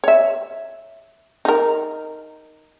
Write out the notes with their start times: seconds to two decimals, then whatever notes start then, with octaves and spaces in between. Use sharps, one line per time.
0.04 C#5 E5
1.45 D#4 A#4